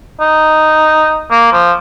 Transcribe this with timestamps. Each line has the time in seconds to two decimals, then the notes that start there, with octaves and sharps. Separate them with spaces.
0.20 D#4
1.31 A#3
1.52 F3